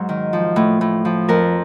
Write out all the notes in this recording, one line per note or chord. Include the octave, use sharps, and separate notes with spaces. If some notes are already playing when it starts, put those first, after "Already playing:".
Already playing: G#2 F#3
D#3
F3
A2
A2
F3
F2 A#4